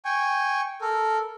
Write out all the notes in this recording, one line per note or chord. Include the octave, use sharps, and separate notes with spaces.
G5 G#5 C#6
A4 A#4